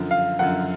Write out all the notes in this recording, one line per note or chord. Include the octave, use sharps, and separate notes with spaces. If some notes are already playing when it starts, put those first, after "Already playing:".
Already playing: F#2 D3 F3
F5
F#2 D3 F3 F#5